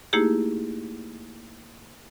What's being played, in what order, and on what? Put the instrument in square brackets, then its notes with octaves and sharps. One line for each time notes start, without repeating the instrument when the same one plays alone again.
[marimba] A3 A#3 D#4 E4 G4 G#4